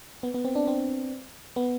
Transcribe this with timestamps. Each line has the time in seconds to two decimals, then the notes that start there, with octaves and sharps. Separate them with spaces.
0.23 B3
0.34 B3
0.45 C4
0.55 D4
0.67 C4
1.56 B3